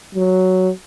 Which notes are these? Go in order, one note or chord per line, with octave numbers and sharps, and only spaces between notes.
F#3